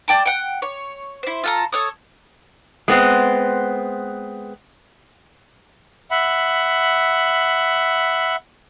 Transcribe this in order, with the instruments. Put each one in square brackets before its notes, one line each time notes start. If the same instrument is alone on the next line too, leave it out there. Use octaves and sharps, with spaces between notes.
[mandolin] D5 G5 A5
F#5 G5
C#5
E4 C5
F4 A4 A#5
A4 C#5 D#6
[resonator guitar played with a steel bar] G#3 B3 C4
[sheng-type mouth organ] E5 F#5 B5